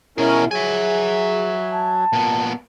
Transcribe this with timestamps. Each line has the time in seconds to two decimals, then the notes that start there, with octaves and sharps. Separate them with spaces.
0.18 B2 C#4 E4 G#4 A#4
0.51 F#3 G#4 E5 G#5
1.73 A5
2.13 A#2 B3